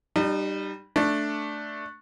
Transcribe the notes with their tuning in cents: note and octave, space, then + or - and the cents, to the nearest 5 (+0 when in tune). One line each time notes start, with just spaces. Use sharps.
G3 +0 D#4 -35
A3 +0 D4 +0